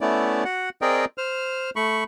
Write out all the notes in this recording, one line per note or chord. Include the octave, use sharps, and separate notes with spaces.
A3 B3 C#4 E4 D5
F#4 F#5
C4 G#4 A#4 D5 D#5 G5
C5 F6
A3 B5 C#6